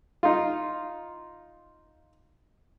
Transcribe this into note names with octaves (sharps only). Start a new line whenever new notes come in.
D#4 F4